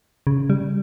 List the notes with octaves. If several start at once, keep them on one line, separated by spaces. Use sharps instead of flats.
C#3
G3